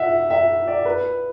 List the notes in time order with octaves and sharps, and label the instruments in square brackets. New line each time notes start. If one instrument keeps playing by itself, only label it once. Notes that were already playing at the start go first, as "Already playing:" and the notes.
Already playing: [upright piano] E5 F#5
E5
D5
B4